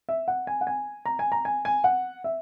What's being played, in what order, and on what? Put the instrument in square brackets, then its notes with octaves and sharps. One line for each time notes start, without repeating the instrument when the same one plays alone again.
[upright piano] E5
F#5
G#5
F#5
G#5
A#5
G#5
A#5
G#5
G#5
F#5
E5